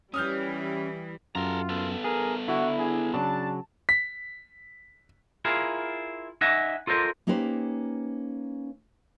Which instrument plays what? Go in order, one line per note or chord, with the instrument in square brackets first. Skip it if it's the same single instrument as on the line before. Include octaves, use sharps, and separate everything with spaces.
[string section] E3 G3 [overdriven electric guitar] C#4 [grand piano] D#6 F6 G6
[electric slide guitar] F#2 [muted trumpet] F4 [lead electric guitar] A4 A#5
[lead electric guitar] B3 A4
[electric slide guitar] G#4 [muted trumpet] A#4
[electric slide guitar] D3 [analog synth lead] E4 [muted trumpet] F#4
[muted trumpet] G#4
[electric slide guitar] C#3 F#3 [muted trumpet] D4 [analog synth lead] A5
[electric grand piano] B6
[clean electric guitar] E4 F4 G#4 A#4
D#4 D#5 E5 F#5 G#5
F4 A4 A#4 C5 D#5
[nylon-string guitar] A#3 C#4 D#4 G4 B4 C5